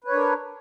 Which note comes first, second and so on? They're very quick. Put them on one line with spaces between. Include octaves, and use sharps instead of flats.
B4 C#5 D4 A#4